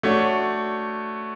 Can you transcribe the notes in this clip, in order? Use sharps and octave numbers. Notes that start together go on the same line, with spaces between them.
A3 D4 F#4 C#5